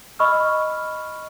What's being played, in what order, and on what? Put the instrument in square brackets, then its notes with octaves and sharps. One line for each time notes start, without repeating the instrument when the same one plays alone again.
[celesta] D#5 B5 C#6 E6 F6